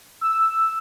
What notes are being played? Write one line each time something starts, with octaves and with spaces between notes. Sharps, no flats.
E6